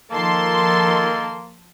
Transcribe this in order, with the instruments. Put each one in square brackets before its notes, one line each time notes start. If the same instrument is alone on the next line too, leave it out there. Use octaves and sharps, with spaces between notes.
[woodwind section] D#3 A4 [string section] F3 A5 C6 [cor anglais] A#3